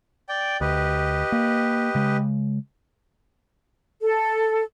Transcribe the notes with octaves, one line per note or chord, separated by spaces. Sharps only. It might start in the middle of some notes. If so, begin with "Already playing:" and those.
D5 G5
D2 G4 B4 D#5
A#3
C#3 G#3
A4